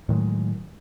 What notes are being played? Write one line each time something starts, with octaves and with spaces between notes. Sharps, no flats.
A2 D#3 F#3 G#3